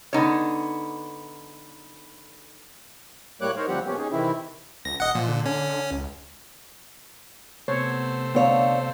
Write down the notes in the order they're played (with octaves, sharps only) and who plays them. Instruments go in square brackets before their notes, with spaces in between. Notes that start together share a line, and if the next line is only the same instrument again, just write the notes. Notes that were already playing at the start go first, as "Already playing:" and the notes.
[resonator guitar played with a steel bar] D3 B3 D#4 C#5
[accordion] A2 G3 A#3 C#5 D6 F#6
D#4 A#4 C5 C#5
D2 F3 G3 C4 G4 F#5
A#2 F3 B3 C#4 G4
C#4 D#4 G#4
C3 D#3 E3 C4 E4
[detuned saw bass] C#2 [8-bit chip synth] A#6
[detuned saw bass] D#1 [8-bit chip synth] D#5 F#5
[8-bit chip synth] A#2 [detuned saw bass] F3
[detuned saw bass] D3
[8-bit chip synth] C#4
[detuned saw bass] C#2
[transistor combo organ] C3 A3 C5 [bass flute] B3 [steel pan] C#5
[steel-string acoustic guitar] D2 C#5 [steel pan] B3 [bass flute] F5